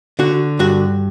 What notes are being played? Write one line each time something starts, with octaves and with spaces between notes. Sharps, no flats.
D3 F#4
G2 F#4